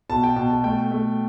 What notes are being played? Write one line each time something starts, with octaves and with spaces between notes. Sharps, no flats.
B2 A5
G5
B2 A5
A5
A3 G5
A3